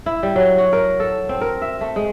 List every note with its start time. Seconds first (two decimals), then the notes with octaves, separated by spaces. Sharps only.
0.06 E4
0.23 G3
0.36 F#3
0.58 F#4
0.73 A#4
1.00 A4
1.29 C4
1.41 A#4
1.62 E5
1.81 A3
1.96 G#3